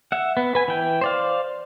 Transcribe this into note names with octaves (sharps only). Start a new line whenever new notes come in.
E5 F#5
B3
B4 G#5
E3 G5
C5 D5 F5